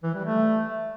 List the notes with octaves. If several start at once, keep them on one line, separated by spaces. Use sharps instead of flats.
E3
G3
A3